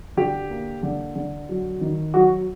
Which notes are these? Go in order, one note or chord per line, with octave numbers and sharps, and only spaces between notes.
D3 G4
A#3
D3
D3
F#3
D#3
F#3 F#4